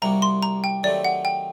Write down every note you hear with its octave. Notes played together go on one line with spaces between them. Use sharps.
C2 C3 G3 A#3 F#4 A#5
C6
A#5
G5
D#3 F#3 A3 C4 G4 D5
F#5
G5